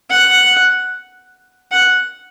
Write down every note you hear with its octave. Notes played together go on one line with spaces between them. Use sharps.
F#5
F#5